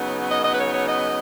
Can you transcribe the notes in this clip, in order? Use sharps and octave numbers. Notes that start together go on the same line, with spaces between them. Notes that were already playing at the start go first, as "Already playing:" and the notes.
Already playing: C#3 F#3 B3 D#4
D#5
D#5
B4
C#5
C#5
D#5